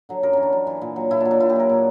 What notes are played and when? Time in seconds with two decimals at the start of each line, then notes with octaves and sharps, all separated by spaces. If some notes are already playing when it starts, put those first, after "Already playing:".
0.09 D3 F#3
0.23 F#2 A#4
0.33 E3 C#4
0.43 D4
0.53 F#2
0.67 E3
0.81 A#2
0.96 F#3
1.11 A#2 E4
1.21 D4
1.25 F#3
1.31 D4
1.40 A#2 E4
1.50 G4
1.55 F#3 A#4
1.69 A#2